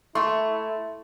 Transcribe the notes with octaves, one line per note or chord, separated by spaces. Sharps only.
A3 E4 C6 C#6